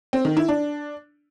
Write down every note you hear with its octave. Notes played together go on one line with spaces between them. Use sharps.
C4
D#3
E4
D4